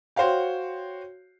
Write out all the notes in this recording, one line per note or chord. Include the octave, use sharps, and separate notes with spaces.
F#4 C5 C#5 F5 G5